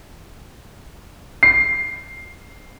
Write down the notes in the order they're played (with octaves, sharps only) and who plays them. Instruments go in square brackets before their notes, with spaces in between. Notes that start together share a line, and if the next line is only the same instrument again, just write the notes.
[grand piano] C7